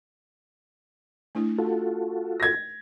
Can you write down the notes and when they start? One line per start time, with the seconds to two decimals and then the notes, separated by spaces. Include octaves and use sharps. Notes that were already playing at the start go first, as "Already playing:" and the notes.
1.35 A3 D4 E4
1.58 F4 F#4 A4
2.40 G#6 A#6